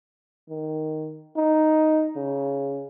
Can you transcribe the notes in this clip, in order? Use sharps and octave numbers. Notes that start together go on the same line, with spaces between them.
D#3
D#4
C#3